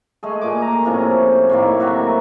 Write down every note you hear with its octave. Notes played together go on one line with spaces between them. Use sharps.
G#3 A3 G#4
A#2 G#5 D6
A#5
A2 C3 F3 C#4
A2 D#3 A#3
C3 F#3 F#4 E5